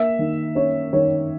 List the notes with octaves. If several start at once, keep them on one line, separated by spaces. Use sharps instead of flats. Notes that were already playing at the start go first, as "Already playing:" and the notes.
Already playing: A#3 E5
D#3
C#4 C#5
D#3 C#5